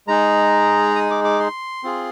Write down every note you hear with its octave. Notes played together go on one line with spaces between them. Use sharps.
G#3 D#4 G#4 A#5
D#6
D6
D6
C6
C4 F4 G#4